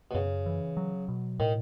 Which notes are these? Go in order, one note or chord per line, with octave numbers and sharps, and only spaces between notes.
B2
F#2 C#3
E3
F#3
B2
A2 D#3